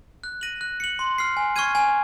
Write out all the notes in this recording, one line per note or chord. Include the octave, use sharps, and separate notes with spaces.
F#6
A#6 D#7 F#7
F#6
C#7 F#7
C6
F6 C7
G#5
C#6 F6 G#6 D#7
G#5